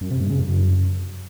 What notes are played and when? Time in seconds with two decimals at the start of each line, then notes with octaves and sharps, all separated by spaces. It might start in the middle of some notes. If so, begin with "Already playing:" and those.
0.01 F#2
0.11 C3
0.21 G2
0.30 C#3
0.40 F#2